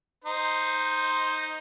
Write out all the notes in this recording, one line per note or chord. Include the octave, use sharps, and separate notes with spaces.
D#4 C5